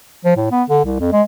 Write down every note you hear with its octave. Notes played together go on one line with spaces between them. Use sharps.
F3
A2
B3
D3
C2
F2
G#3